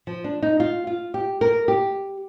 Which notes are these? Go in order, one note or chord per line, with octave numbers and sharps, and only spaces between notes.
F3
D4
D#4
F4
F4
G4
A#4
G4